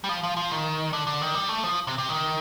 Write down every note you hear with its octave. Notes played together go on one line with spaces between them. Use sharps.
G3
F3
F3
F3
D#3
D3
D3
D#3
G3
A3
F3
C3
C3
D#3